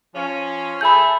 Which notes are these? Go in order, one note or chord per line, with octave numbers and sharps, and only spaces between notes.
F3 C#4
G#4 A4 E5 B5 G6